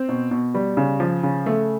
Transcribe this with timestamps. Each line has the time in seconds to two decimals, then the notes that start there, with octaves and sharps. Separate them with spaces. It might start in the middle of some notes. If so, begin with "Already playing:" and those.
Already playing: C4
0.09 B2
0.31 B2
0.55 G3
0.77 C#3
1.00 F3
1.23 C#3
1.46 A3